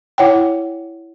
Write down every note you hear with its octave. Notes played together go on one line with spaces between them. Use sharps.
E4 C#5 F#5 G5